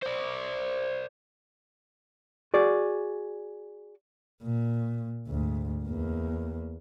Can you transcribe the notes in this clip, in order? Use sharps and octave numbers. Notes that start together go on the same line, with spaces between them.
C5 D5
F#4 G#4 D5
A#2
D2 G#2
E2 A#3